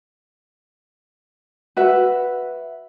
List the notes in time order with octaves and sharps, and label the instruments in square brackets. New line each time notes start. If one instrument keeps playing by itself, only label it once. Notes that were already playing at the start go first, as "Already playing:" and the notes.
[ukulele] F#4 B4 E5